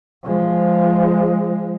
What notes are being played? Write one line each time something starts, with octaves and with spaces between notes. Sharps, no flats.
F3 G#3